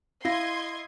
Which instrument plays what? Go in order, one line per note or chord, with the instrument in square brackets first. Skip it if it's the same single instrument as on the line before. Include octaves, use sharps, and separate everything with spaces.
[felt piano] E4 [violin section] D#5 C6 G#6 [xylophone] F5 A#6